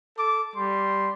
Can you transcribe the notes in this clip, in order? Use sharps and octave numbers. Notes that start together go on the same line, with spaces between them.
A4 D6
G3 C6